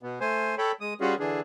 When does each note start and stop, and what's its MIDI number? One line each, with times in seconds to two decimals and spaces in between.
0.03 0.19 47
0.03 0.19 59
0.21 0.55 57
0.21 0.55 72
0.21 0.55 80
0.58 0.72 69
0.58 0.72 73
0.58 0.72 79
0.58 0.72 83
0.81 0.94 56
0.81 0.94 87
1.01 1.15 55
1.01 1.15 61
1.01 1.15 65
1.01 1.15 66
1.01 1.15 68
1.20 1.40 50
1.20 1.40 52
1.20 1.40 62
1.20 1.40 68